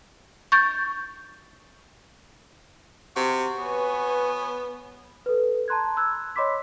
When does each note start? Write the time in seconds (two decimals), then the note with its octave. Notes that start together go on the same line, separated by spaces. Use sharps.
0.52 C#6 G6 A6
3.16 C3 F#4
3.58 B3 B4 C#5 G#5
5.26 A4 B4
5.68 A5 A#5 C6 F#6 G#6
5.96 B5 E6 F#6 G#6
6.36 C#5 D#5 B5 C6 D6 B6